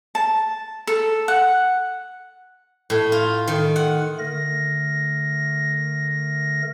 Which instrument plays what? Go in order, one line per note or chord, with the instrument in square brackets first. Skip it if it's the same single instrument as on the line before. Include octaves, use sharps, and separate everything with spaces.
[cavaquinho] A5
A4
F#5
[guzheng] A2
F4
D#3
F#5
[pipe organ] D3 A3 A#4 A#6